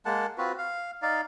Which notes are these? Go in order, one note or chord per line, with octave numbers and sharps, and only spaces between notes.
G#3 A#3 F#5 A5
C4 F4 F#4 B4
F5
D#4 D5 F5